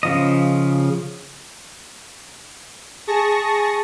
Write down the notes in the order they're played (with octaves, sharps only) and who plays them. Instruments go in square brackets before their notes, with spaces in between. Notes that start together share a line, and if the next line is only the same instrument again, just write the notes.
[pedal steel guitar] C#3 F3 D#5
[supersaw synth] G#4 A5 C#6 A#6